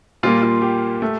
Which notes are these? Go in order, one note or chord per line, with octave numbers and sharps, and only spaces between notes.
A#2 G3 A#3 F4
F4
G4
A3